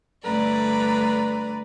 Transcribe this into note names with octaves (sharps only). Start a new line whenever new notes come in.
G2 D3 A3 B4 D5 A#5